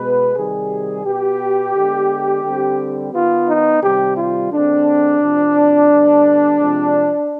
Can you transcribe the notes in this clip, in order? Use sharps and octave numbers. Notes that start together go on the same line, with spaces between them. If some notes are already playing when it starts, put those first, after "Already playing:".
Already playing: B2 G#3 B3 B4
C3 D#3 G3 G#4
B2 B3 G4
D3 G#3 B3
D3 G3 C4
D#3 B3 F4
D#4
C3 D#3 G3 G4
F4
D3 G#3 C4 D4
C3 F3 C4
D3 G3 B3
C3 F3 G#3 C4